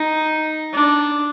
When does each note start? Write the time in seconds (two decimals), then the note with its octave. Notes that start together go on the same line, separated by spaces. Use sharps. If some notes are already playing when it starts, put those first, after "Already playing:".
Already playing: D#4
0.73 D4